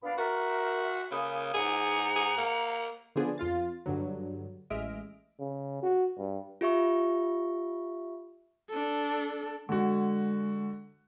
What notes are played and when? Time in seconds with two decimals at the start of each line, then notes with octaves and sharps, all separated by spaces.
0.02 A#2 B3 D4 F5 B5
0.18 F#4 A#4 E5
1.11 C#3 A#3 G#5 B5 D#6
1.54 G#2 G#4 F#5 A#5
2.16 G#4
2.37 A#3
3.16 D3 F3 B3 D4 G#4 C5
3.38 F2 F4 F5 A6
3.86 G2 D3 F#3
4.70 A1 G#3 D#5 E5 F6 D7
5.39 C#3
5.83 F#4
6.18 G2
6.61 F4 G4 E5 C#6
8.70 D4 A4
9.69 D3 G#3 F#4